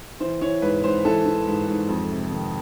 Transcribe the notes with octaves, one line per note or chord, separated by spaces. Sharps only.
E3 C5
E3 C#5
G#2 B4
G#2 C5
E3 A4
E3
G#2
G#2
F2
C3
D#3